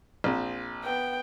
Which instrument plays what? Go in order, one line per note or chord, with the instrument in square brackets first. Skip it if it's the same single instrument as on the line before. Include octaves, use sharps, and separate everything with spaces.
[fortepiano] A#1 C4
[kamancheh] B3 G5